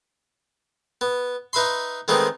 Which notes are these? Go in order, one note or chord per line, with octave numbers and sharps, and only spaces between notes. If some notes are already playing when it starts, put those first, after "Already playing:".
B3
D#4 B4 E5 B5 C6
D#3 G#3 A3 B3 C4 D#4